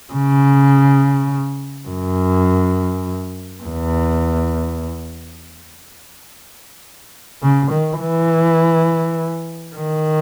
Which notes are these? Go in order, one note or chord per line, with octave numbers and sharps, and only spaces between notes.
C#3
F#2
E2
C#3
D#3
E3
D#3